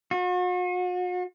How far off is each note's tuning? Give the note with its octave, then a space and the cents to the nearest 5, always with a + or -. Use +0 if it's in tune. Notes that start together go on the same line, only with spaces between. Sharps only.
F#4 -45